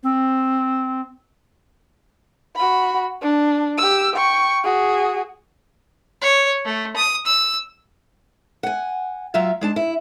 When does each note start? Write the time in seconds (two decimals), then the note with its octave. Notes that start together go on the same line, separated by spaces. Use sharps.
0.03 C4
2.56 F#4 B5
3.22 D4
3.78 G4 E6
4.15 G5 C#6
4.64 F#4 G#4
6.22 C#5
6.65 A3
6.96 D#6
7.27 E6
8.63 F#5 G#5
9.34 F#3 F4 E5 F5
9.61 G#3 D4 A5
9.76 E4